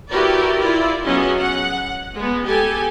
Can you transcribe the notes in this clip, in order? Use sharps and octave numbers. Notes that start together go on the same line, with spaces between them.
E4 F#4 G4 A#4 B4 D5
E4 F4 D5
F#3 B3 C#4 G#4 D#5
F#5
G#3 B3
G4 A4 G#5